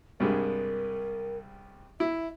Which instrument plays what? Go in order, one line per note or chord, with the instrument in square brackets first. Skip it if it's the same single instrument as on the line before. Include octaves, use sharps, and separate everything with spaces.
[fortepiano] C2 G2 G#3 [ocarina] A#4
[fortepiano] E4 [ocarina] E5